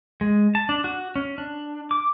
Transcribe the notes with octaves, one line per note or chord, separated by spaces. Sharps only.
G#3
A5
D4
F#4
C#4
D4
D6